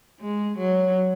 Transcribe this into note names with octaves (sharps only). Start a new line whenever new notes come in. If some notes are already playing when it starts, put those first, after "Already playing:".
G#3
F#3